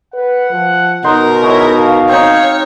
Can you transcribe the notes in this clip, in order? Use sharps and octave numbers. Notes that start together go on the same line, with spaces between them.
B4 F#5
F3
B2 D#4 A#4 C6
G#3 E4 F#4 C#5
F5
C4 D#4 C#5